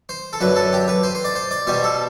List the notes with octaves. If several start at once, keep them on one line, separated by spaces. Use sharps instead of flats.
C5
A4
F#2 D3 F#3 B4
A4
G4
B4
C5
C5
D5
C5
D5
B2 G3 C5
A4